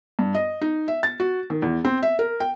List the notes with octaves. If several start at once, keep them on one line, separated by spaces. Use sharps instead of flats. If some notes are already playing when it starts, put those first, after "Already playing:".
G2
D#5
D#4
E5
A6
F#4
D#3
E2
C4
E5
A#4
G5